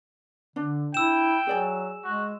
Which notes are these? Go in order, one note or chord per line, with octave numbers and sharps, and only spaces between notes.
D3 D4
E4 G5 E6 E7
F#3 G#4 D5 G#5
G#3 F#4